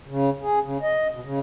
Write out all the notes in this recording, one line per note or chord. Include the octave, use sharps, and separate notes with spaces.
C#3
G#4
C#3
D#5
B2
C#3